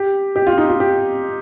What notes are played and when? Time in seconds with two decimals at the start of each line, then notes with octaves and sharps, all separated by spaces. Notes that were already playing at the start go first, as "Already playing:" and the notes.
Already playing: G4
0.36 G4
0.47 F4
0.58 D#4
0.68 F4
0.80 G4